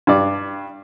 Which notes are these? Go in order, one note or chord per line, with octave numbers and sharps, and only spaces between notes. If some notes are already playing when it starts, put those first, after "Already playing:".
G2 D5